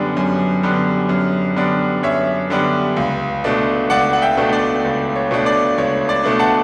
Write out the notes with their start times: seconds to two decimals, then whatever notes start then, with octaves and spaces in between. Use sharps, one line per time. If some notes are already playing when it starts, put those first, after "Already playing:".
Already playing: F#2 D3 G3 B3 D4
0.17 F#2
0.63 D3 G3 B3 D4
1.09 F#2
1.56 D3 G3 B3 D4
2.03 F#2 C#5 E5
2.50 D3 G3 B3 D4
2.97 C#2
3.44 B2 A3 D4
3.90 C#2 D5 F#5
4.13 F#5
4.22 E5 G5
4.37 B2 A3 D4
4.53 D5
4.84 C#2
5.16 C#5
5.31 B2 A3 D4
5.46 D5
5.78 C#2 C#5
6.09 D5
6.24 B2 A3 D4
6.39 F#5 A5